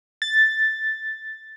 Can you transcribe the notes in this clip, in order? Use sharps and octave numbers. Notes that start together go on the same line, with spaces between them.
A6